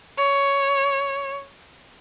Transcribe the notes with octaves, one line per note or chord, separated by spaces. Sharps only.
C#5